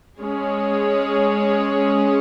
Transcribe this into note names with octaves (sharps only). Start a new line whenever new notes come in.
G#3 C#4 G#4 C#5